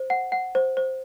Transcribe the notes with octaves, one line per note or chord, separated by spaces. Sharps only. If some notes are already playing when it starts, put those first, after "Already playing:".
Already playing: C5
F#5
F#5
C5
C5